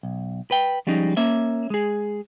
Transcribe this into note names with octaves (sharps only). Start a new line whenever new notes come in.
B1
B4 G5
F3 G3 G#3 C#4 D#4
A#3 C#4 E5
G#3 G#4